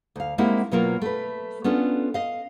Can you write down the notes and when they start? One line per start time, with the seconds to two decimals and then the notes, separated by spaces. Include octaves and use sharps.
0.16 D2 F5
0.38 G#3 A#3 C4 E4 G4 F#5
0.72 B2 F#3 A#3 F4 A#4
1.02 A3 B4
1.64 B3 C#4 D4 F4 A4
2.14 D#5 F5